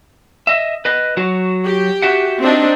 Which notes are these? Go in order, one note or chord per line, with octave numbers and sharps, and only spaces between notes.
D#5 E5
B4 D#5
F#3 F#4
G4
F#4 E5 F#5
C4 D4 D#4